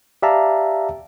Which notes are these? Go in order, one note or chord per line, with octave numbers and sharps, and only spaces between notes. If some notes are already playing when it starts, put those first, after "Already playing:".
G4 D5 E5 F5 A5 A#5